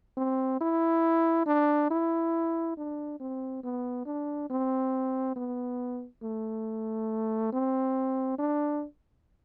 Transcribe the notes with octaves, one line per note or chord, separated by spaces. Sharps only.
C4
E4
D4
E4
D4
C4
B3
D4
C4
B3
A3
C4
D4